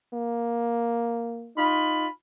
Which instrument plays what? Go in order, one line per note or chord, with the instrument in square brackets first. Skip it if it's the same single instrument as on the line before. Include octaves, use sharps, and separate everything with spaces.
[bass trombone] A#3
[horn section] D#4 F4 B5